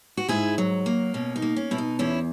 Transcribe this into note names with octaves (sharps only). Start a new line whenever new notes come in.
F#4
G#2 E4 G#4
F#3
A#3
B2 C#4
D#4
A#3
C#4
B2 E4
D#4
E2 C#4 E4